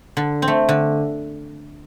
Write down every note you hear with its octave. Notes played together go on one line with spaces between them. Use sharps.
D3
C4
A3
D3